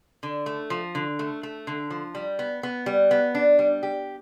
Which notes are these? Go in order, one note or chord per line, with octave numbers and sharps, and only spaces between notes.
D3
A3
F3
D3
A3
A3
D3
F3
G3
B3
B3
G3
B3
D4
G3
G4